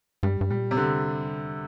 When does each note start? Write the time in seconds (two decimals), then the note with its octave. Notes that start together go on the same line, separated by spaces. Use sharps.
0.23 G2 G3
0.41 G2
0.50 A#2 G3
0.71 C3
0.77 D3